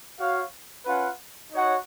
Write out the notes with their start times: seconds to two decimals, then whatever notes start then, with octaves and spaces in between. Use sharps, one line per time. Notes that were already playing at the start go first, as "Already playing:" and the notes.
0.18 F#4 C#5 F5
0.85 C#4 F4 B4 F#5
1.52 D#4 F#4 C#5 F#5